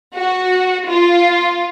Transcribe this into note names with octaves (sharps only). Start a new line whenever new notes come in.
F#4
F4